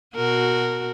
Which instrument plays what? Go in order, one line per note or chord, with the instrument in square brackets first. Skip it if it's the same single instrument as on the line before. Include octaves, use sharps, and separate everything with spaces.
[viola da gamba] B2 F#4 A#4